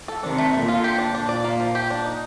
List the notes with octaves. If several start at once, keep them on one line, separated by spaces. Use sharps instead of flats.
A4
C3 D#3 D4
A3
A#2 D3 A3
F4
G4
D4
A#2 D4
D5
A#3
F3
G4
D4
D#4